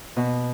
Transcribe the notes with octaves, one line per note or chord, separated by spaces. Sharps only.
B2